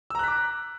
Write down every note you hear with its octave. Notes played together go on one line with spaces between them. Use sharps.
A#5 D6 E6 F#6 B6